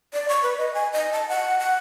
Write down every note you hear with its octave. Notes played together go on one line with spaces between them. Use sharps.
D5
C#6
B4
D#5
G#5
D#5
A5
F#5
F#5